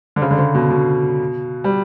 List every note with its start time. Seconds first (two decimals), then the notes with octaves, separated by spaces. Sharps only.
0.16 D3
0.22 C#3
0.31 D3
0.39 C#3
0.55 B2
0.71 B2
1.64 G3